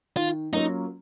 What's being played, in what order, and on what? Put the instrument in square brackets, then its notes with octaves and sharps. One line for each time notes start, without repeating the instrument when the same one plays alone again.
[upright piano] D#3 [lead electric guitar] F4
[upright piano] F#3 A#3 C#4 F4 [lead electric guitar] D#4